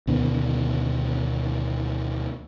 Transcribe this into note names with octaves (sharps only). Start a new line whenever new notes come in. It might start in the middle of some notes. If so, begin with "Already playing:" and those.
D2 B2 D#3